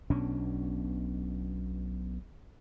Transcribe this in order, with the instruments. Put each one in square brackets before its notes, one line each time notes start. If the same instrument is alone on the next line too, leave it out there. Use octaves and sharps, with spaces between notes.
[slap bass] B1 B2 C#4 D4